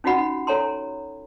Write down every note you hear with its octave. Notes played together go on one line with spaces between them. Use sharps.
C#4 D#4 F4 F#4 F#5 B5
A4 C#5 G#5 A#5 C6